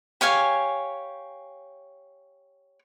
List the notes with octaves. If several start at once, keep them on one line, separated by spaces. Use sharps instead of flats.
G4 C#5 F5 G#5